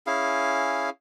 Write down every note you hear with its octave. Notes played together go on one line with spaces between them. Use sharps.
C#4 E4 G#4 F5